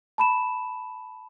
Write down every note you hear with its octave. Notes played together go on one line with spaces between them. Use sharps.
A5 B5 E7